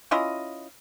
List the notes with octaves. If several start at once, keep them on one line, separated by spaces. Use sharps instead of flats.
C#4 E4 F4 D#5